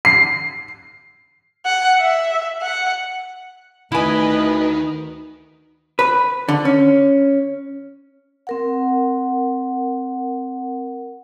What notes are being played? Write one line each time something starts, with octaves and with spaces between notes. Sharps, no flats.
C7
F#5
E5
F#5
D2 D#3 E4 B4 D#5 G#5
B4
D3
C#4
C4 A#4 F#5